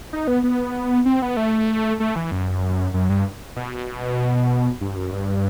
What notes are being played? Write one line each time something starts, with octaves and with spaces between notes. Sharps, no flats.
D#4
B3
B3
C4
B3
A3
A3
E3
F#2
F#2
G2
B2
G2
F#2
G2